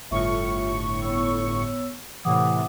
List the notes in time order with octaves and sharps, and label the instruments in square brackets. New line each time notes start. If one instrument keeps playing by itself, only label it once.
[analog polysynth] G1 A2 C#6 [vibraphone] F4 E5
[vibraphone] B3 C#5 E6
[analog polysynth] A2 C3 E3 [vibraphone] F#5 D6 D#6